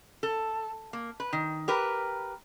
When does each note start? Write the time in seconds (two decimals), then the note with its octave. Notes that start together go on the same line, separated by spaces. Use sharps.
0.23 A4
0.93 A#3
1.20 B4
1.33 D#3
1.68 G4 A#4 B4